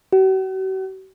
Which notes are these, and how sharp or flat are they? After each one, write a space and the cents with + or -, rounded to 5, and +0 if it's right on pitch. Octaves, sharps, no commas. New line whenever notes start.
F#4 +45